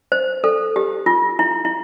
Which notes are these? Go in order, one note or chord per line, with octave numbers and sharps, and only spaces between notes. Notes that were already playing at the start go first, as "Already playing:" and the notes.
C5
A4
G4
F4
E4
E4